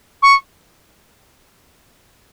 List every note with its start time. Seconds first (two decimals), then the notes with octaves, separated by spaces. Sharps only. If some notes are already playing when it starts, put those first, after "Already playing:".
0.22 C#6